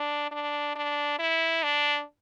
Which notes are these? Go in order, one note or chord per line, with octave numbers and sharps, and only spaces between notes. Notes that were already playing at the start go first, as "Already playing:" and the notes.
Already playing: D4
D4
D4
E4
D4